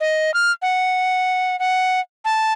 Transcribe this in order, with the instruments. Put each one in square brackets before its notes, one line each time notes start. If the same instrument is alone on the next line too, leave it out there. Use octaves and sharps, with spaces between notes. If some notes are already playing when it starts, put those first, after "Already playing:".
[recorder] D#5
F6
F#5
F#5
A5